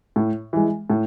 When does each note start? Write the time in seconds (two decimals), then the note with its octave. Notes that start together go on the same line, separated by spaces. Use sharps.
0.16 A2
0.53 E3 G#3
0.90 A2